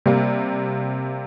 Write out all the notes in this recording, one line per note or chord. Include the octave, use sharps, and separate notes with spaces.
C3 G3 A#3